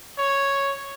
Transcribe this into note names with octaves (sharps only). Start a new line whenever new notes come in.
C#5